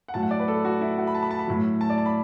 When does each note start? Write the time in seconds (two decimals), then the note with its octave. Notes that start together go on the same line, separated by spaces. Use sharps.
0.08 F#5
0.14 A2 F#3 A5
0.23 F#5
0.31 D5
0.39 B4
0.48 A4
0.65 F#4
0.81 E4
0.98 F#4
1.07 B5
1.15 A5
1.23 B5
1.31 A5
1.39 B5
1.48 A2 F#3
1.81 A5
1.90 D5
1.98 A5
2.06 B5